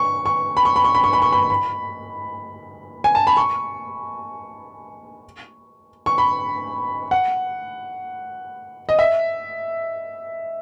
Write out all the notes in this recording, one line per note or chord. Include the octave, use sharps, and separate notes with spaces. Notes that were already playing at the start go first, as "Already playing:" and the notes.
Already playing: C#6
C#6
B5
C#6
B5
C#6
B5
C#6
B5
C#6
B5
B5
G#5
A5
B5
C#6
C#6
B5
F#5
D#5
E5